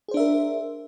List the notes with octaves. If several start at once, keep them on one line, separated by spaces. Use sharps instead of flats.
D4 G#4 A#4 C5 E5